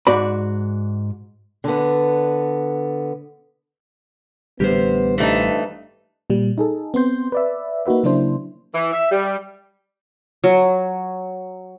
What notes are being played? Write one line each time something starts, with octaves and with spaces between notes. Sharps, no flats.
G#2 F#4 D5 B5
D3 B3
A1 D3 G3 B3 G4 C5
G2 E3 A3 D#4
A#2 G3
D#4 G#4 A4
B3 C4 C6 G6
B4 D5 E5
A#3 D#4 F#4 B4 E5
C#3 F#3 A#3 D4 E4 C5
E3
E5
G3
F#3